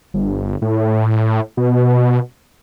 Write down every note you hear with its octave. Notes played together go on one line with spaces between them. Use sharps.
G1
A2
B2